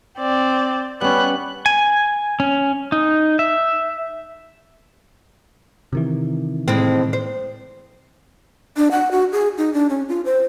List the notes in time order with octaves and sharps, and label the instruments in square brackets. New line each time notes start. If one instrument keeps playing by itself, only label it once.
[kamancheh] C4 D5
[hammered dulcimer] G3 C#4 [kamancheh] B3 F#6
[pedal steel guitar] G#5
C#4
D#4
E5
[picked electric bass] C3 D#3 E3
[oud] A2 G#3 C4
C5
[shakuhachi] D4
F#5
F#4
G#4
D#4
D4
C#4
F4
C5